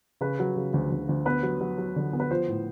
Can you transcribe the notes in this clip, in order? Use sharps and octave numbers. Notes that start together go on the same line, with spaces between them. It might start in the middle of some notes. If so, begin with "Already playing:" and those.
C#3 B4
F#3
C#3
D2
D2
D2
B3 B4
F#3
F#3
F#3
D3
B3
B4
F3 C5
A2